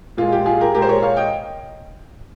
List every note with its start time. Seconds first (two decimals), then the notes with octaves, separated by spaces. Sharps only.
0.17 A#2 G#3 F4
0.32 G4
0.46 F4 G#4
0.61 G4 A#4
0.74 A#2 G#3 G4 A#4
0.82 C5
0.89 A#4 C#5
1.02 C#5 F5
1.17 D#5 G5